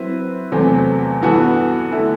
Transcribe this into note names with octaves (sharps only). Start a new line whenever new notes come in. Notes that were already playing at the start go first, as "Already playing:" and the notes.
Already playing: F#3 C4 E4 B4 E5
E2 C3 F#3 A3 C4
G2 E3 B3 F#4 A4
D3 A3 E4 A4